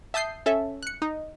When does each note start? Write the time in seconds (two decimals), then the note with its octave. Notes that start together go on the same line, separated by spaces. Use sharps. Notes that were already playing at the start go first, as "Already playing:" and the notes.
0.14 E5 A5 D#6 G6 C7
0.46 C#4 A4 E5
0.83 F#6 C#7
1.02 D#4